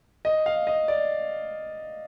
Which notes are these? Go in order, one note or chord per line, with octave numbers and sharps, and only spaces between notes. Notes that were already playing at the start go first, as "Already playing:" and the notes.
D#5
F5
D#5
D5